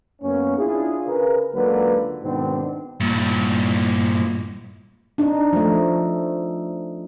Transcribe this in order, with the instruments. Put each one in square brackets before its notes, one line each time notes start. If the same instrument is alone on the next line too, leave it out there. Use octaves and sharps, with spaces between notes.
[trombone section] F#2 A#3 B3 C#4
D4 E4 F4 G#4
C#3 A#4 B4
C#2 D3 F#3 A#3 B4
G#2 B2 D#3 B3 C4 D4
[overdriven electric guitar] G2 A#2
[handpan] D4 D#4
F3 A3